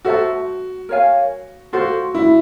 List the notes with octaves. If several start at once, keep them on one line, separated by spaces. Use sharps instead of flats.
F#4 A4 C5 E5 A5
A#4 C#5 F5 G#5
F4 F#4 A4 C5
E4